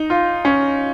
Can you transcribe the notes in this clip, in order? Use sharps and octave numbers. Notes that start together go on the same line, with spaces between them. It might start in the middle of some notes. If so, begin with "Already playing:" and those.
Already playing: D#4
F4
C#4